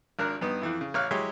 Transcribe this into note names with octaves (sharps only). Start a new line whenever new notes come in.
G#1 D4 A#4 F#6
G2 B3 D#4
F2 E3 E4
C#3
A1 C#5 F5 F6 F#6
F#3 G#3 E4 G4 C#5